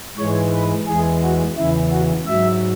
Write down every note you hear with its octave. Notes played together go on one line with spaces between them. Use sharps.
G#2 E3 G#3 C#5
B4
E2 E3 G#3 G#4
F#4
E2 C#3 E3 E4
F#4
G#2 F#3 E5